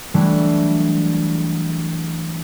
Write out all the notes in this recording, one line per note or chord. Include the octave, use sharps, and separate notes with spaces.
E3 F#3 G3 A3 D4 E4